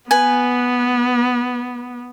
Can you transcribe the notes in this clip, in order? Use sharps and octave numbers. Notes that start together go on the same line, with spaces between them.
B3 B4 G#5